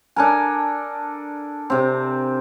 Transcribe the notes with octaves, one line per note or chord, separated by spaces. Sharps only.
D4 A4 A#4 G#5
C3 C4